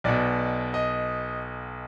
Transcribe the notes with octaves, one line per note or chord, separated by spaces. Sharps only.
B1 B2 D5
D#5